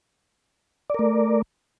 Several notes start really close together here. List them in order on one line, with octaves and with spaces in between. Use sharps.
D5 A#4 A3